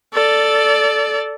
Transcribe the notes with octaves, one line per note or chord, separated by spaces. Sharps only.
A4 D5